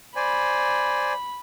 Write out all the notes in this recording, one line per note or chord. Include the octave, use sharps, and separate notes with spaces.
C5 D5 G#5 B5